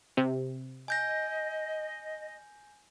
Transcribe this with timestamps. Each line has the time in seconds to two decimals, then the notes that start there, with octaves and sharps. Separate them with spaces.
0.17 C3
0.88 D#5 G#5 G6 A#6